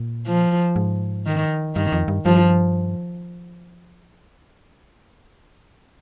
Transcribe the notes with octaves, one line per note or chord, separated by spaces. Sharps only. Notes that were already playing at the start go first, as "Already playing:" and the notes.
Already playing: A#2
F3
G#2
D#3
G2 D#3
F2
G2
G2 F3